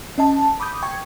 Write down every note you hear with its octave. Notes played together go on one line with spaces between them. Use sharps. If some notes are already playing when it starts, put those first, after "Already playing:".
C#4 D#5 A5
B5 D6 D#6 G6
G5 C#6 G#6